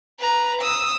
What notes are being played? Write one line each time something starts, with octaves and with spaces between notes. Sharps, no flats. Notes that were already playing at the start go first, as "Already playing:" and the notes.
B4 A#5
D#6 E6